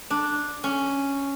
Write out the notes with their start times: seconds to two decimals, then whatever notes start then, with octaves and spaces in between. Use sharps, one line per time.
0.10 D4
0.64 C#4